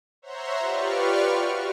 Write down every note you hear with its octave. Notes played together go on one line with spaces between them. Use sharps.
C5 C#5 E5 F#5 A#5 C6
F4 G4 B4 D5 C#6 F6
F#4